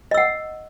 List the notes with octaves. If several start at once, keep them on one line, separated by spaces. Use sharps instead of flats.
D#5 F#5 E6